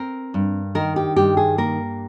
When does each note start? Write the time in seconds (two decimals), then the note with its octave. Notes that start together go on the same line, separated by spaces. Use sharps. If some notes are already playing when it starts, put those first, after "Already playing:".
Already playing: C4 A#4
0.34 G2
0.75 D#3 A#4
0.96 G4
1.16 G2 G4
1.37 G#4
1.58 A#3 A#4